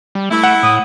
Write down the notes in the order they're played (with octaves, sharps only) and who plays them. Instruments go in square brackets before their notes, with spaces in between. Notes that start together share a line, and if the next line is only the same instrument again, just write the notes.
[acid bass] G3
[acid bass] A3 [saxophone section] E4
[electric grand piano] F#5
[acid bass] A2 [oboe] D#6